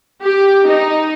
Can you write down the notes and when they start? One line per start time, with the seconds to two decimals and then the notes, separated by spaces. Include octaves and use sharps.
0.21 G4
0.68 D#4